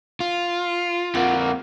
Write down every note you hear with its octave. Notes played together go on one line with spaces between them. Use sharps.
F4
F2 A#3 F#5